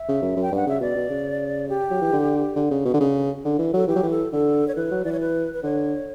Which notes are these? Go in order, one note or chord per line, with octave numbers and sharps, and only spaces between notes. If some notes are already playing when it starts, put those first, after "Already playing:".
Already playing: E5
C#3
F#2
F#2
G5
G2 F#5
C#3 E5
B2 D5
B2
C#3
G4
F#3
E3
D3
D3
C#3
B2
D3
C#3
D3
E3
F#3 A4
E3 G4
F#3
E3
A4
D3 A4
C#5
E3 B4
F#3
E3 D5
C#5
B4
B4
D3 C#5